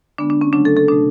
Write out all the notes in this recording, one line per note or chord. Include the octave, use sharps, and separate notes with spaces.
D3 G#3 B3 D4
D4
C#4
C#3 F#3 A3 D4
A4
A4
B2 A3 D4